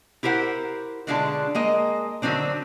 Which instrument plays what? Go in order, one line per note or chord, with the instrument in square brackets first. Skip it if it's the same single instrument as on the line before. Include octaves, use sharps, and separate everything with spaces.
[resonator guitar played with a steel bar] E4 G4 A#4 C5 F#5
B2 D3 G#3 D4 F4 A5
G#3 A#3 D#5
D3 D#3 F#3 C4 D4